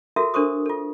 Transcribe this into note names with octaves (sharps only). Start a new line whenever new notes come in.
F4 F#4 A4 A#4 E5
D4 A4 A#4 C5 C#6 D#6
F4 A4